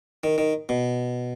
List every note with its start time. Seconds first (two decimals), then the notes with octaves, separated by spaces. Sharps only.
0.24 D#3
0.38 D#3
0.69 B2